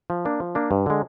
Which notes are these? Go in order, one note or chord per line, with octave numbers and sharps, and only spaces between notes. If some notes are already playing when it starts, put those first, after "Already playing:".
F3
A#3 D4
F3
A#3 D4
G2
D3 G#3